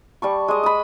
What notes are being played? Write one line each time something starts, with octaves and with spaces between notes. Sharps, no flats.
G3 A5 C#6
G#3 D#5
B5 D#6